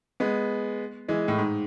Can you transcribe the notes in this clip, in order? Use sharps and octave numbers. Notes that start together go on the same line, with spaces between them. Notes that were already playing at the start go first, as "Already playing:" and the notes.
G#3 B3
E3 G#3
A2
G#2